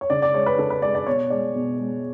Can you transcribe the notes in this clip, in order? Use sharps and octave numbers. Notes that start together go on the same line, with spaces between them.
C#5
C#3 D5
D5
G#3 C#5
B4
C#3 A4
B4
G#3 D5
D5
B2 C#5
G#3 D5
B2
G#3